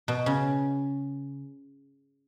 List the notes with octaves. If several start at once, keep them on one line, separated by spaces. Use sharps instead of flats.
B2
C#3